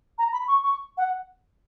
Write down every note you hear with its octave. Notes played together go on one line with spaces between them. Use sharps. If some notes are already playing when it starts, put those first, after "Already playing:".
A#5
B5
C#6
C#6
F#5